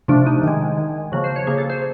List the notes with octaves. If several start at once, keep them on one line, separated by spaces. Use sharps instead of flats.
C3 F3 A3 D4
D#4
D#3 G#3
D#3 G#3
C#3 F3 A#3 F#4
C5
C#5
C#3 F3 A#3 G#4
A4
C5